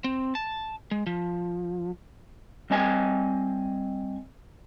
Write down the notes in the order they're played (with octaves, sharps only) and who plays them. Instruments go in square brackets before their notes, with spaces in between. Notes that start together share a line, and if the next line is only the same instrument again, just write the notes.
[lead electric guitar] C4
A5
G#3
F3
[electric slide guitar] G3 C4 D#5 G#5